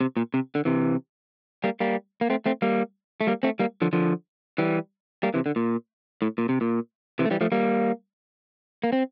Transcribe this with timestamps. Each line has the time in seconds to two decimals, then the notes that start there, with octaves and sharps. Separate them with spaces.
0.01 C3
0.17 A#2
0.34 C3
0.55 D3
0.65 C3 E3
1.64 G3 A#3
1.80 G3 A#3
2.21 A#3
2.30 A3 C4
2.46 A3 C4
2.62 G3 A#3
3.21 A3
3.27 G3 A#3
3.43 A3 C4
3.59 G3 A#3
3.82 D3 F3
3.93 D3 F3
4.58 E3 G3
5.23 G3 A#3
5.34 C3 E3
5.46 D3
5.56 A#2
6.22 A2
6.38 A#2
6.49 C3
6.61 A#2
7.19 C3 E3
7.25 A3
7.31 E3 G3
7.41 F3 A3
7.52 G3 A#3
8.84 A#3
8.93 C4